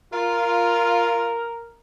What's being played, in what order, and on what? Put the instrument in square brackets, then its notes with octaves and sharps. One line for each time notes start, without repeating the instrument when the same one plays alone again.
[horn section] F4 [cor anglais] A#4